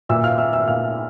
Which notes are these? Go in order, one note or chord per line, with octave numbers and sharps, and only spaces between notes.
A#2 E5 E6
F5 F6
E5 E6
E5 E6
A#2 F5 F6